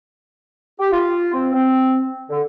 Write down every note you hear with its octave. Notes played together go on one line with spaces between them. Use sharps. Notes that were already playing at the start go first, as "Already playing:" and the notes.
G4
F4
C4
C4
D3